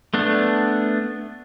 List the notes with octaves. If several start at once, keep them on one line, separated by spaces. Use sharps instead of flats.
A3 B3 D4